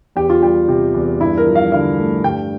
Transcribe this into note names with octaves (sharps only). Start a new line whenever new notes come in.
E2 G4
F4
G3 G4
C3
E2
G2 E4
A#4
F3
F5
D3 F5
A3
G2 G5